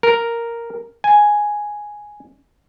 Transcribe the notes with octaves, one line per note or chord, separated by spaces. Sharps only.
A#4
G#5